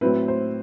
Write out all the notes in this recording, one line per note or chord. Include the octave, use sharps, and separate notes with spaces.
A2 F#3 C4 E4 B4
C5